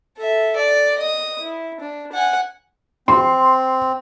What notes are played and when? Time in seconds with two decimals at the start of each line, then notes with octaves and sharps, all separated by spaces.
0.17 A4 E5
0.56 D5
0.99 D#5 D#6
1.41 E4
1.80 D4
2.12 F#5 G#5
3.08 C4 C6